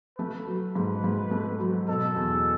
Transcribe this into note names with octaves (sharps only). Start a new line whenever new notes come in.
A3 B4
F#3
G#2
G#2
A3
F#3
B2 A4
E2